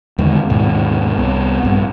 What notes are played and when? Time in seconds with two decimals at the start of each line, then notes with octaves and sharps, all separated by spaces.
0.18 E2 D3 D#3 G#3
0.49 D#2 G#2 B2
1.18 C2 B3
1.63 A#1 G2